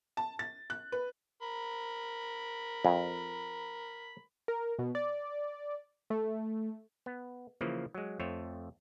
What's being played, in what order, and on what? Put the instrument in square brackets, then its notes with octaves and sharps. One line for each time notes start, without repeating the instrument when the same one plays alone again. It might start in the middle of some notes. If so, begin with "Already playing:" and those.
[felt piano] A5
A6
F#6
B4
[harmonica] A#4 B5
[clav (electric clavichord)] F2
[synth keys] A#4
B2
D5
A3
[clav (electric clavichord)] B3
C#3 E3 F3 A#3
F#3 G#3
F2 A3 C5 C#5